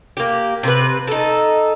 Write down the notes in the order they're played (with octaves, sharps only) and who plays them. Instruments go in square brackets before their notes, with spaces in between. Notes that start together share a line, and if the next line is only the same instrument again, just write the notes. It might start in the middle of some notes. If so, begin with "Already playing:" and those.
[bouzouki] A#3 G4
C3 B4
D#4 A4